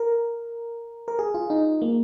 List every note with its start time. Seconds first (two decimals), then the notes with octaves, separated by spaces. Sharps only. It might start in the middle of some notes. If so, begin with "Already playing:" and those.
Already playing: A#4
1.08 A#4
1.19 G#4
1.34 F4
1.50 D#4
1.82 A#3